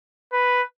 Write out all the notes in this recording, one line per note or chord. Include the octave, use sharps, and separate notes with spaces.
B4